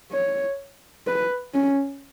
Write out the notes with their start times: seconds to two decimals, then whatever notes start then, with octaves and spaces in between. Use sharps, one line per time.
0.12 C#5
1.07 B4
1.54 C#4